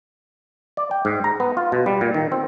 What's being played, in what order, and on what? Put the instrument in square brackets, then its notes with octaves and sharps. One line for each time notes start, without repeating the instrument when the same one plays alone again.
[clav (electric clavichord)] D5
G5
G#2
A#5
B3
F4
B2
G3
A#2
D#3
C4